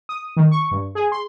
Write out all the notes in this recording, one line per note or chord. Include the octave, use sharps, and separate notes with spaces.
D#6
D#3
C#6
G2
G#4
C6